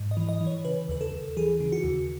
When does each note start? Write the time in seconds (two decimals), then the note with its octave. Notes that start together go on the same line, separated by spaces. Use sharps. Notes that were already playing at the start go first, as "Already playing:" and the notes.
Already playing: G#2
0.11 D#5
0.17 E3
0.29 D#5
0.41 E3
0.47 C#5
0.65 C#3 B4
0.88 D#2 B4
1.01 A4
1.12 D#2
1.37 E3 G#4
1.60 C#3
1.72 F#4
1.84 D#2